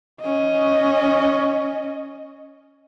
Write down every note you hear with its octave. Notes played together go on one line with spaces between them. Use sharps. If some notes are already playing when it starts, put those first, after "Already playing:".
C#4 D#5